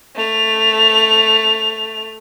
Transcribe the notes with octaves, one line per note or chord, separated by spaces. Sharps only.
A3 F7